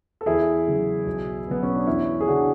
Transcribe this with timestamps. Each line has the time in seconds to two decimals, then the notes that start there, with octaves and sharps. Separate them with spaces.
0.21 A4
0.26 E2 E4 G#4
0.67 C#3 F#3
1.06 B1
1.47 B2 F#3 B3
1.63 C#4
1.75 D4
1.87 E2 C#4 E4
2.21 G#4
2.27 C#3 E3 D4 F#4